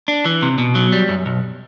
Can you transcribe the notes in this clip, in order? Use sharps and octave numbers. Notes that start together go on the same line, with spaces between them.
D4
E3
C3
B2
F#3
G3
F#2
B1